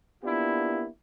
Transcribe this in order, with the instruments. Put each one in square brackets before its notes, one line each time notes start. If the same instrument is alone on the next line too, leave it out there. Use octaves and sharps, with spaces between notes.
[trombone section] A#3 B3 D4 E4 F4 G4